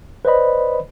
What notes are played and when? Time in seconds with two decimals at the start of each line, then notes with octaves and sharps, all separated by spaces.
0.25 B4 C5 D5 D#5 B5